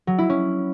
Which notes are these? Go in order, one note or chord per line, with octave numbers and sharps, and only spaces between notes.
F#3
E4
C#4